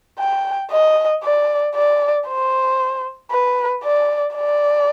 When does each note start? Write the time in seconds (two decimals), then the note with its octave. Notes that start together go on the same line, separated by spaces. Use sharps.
0.19 G5
0.71 D#5
1.23 D5
1.75 D5
2.28 C5
3.31 B4
3.84 D5
4.35 D5